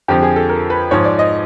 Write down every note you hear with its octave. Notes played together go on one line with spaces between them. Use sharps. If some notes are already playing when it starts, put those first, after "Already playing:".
F2 D3 F3 G4
G#4
A4
A#4
B4
G#2 F3 C#5
D5
D#5